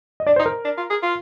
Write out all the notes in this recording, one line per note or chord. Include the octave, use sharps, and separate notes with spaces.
D#5
D4 D5
D#4 C5
A#4
D4
F4
G#4
F4